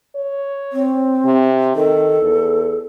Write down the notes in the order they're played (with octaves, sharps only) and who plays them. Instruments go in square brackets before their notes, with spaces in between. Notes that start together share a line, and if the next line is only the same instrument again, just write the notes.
[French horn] C#5
[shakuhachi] C4
[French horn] C3
[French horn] D#3 [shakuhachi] A4
[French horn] E2